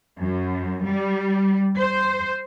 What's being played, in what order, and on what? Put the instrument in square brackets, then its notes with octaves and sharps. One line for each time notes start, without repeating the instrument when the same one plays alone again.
[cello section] F#2
G3
C5